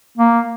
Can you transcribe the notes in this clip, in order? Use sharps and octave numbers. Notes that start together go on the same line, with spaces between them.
A#3